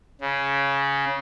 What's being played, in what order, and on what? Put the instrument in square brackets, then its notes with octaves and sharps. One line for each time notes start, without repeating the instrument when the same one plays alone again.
[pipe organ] C#3